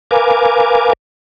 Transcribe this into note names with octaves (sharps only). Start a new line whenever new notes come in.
A#4 B4 F5 G#5 D6